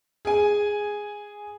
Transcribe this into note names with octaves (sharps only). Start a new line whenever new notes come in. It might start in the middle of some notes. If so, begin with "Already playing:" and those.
G#4 G#5